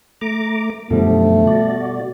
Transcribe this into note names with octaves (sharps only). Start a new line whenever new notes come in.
A3 A#5 D6
F#2 B2 D3 F3 G3 A3
F#4 D5